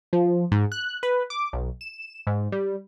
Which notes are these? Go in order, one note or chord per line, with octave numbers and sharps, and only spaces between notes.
F3
G#2
F#6
B4
D6
B1
E7
G#2
G3